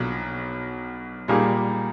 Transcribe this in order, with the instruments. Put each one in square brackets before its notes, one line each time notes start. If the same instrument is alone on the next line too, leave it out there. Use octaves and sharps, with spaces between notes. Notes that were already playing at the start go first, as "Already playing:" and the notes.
Already playing: [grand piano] B1 B2 [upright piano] F3 A#3 D4
[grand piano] A#2 [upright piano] G3 A#3 D#4 G#4